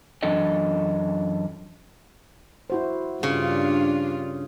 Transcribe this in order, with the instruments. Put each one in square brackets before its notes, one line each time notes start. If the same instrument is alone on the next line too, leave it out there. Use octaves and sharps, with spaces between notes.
[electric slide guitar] F#2 E3 D4 A4 D#5
[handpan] E4 F#4 C5
[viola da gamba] G2 D4 F4 [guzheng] C#3